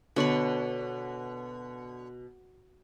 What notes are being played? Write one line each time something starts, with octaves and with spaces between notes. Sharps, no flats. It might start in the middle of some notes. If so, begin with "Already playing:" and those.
B2 D3 C#5 B5